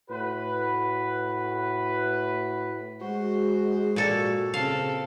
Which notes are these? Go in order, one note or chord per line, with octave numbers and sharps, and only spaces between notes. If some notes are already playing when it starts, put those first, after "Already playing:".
A2 F#4 B4
G#3 F#4 C5
A#2 A4
C#3 C4 A4 F5